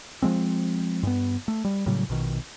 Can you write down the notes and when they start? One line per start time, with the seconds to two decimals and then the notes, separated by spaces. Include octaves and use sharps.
0.22 F3 G#3 C4
1.03 G2 B3
1.48 A3
1.65 G3
1.86 A2 C#3 F#3 G3
2.09 A#1 B2 D#3